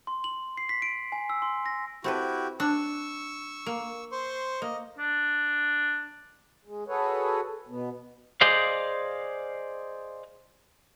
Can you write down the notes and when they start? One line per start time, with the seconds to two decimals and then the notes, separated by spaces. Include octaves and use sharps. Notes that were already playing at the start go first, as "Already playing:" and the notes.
0.07 C6
0.24 F#7
0.57 C7
0.69 B6
0.82 D7
1.12 G#5
1.30 E6
1.42 C6
1.66 A#6
2.04 C4 E4 F#4 G4 A4 B4
2.60 D4 C#6 E6
3.66 A#3
4.12 C5 C6 C#6
4.62 A#3 D#5
4.98 D4
6.65 G#3
6.88 F#4 G#4 A4 B4 C#5
7.68 B2 B3
8.41 G#4 C5 D5 D#5 F5